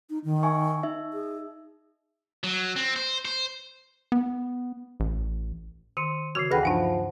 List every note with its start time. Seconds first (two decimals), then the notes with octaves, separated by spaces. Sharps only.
0.10 D#4
0.24 D#3
0.43 E5 G#5 C#6
0.83 D#4 E5
1.13 G#4
2.44 F#3
2.76 C4
2.96 C5
3.25 C5
4.12 B3
5.00 A1
5.97 D#3 C6 C#7 D#7
6.35 C#3 E3 F#4 G#6 C7
6.51 D2 D3 G#4 B4 F#5 G5 A#6
6.63 G2 F3 D4 D#4 F5 F#5 A5